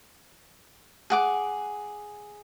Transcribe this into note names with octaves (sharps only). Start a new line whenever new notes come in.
G#4 F#5 D6